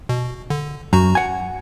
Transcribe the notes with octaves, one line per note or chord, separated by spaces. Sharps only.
B2
D3
F#2 F#4 A#5
F#5 G#5